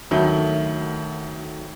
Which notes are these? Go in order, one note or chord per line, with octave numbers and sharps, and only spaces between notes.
D2 D#3 F#3 A3